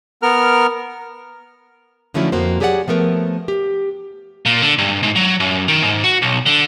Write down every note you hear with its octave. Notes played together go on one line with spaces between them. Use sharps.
B3 A#4 F6
D3 F3 F#3 A3 C#4 E4
F2 A#3 F#4 C5
F#3 G4 G#4 D5 D#5 F#5
F3 A3 B3 A#4
G4
A#2
D3
G2
G#2
F#3
F#2
D#3
G#2
F#4
B1
D3